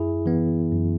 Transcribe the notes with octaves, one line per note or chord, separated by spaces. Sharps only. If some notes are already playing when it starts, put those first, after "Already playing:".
Already playing: F#2 E4 G#4
E3 B3
F#2